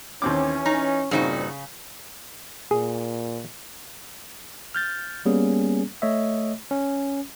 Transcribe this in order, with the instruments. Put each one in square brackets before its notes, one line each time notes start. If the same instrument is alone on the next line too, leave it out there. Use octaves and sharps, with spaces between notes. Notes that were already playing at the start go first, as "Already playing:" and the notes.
[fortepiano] D#2 C4 D6 [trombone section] E3 C#4
[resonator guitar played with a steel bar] D#4 [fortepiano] A#5
[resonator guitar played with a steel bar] G2 D#4 F#4 [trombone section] A#2 C4 [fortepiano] C#3
[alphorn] A#2 [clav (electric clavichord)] G#4
[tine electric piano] F6 G6 A6
G3 A#3 B3 C#4 G#4
A3 C#5 D#5 E5
C#4